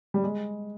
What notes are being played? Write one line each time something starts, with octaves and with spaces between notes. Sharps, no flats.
G3
G#3